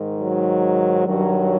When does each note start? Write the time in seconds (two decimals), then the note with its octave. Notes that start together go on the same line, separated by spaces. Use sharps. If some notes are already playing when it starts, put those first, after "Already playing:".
Already playing: G#2 D#3
0.19 F#3
1.06 G2 D#3 F#3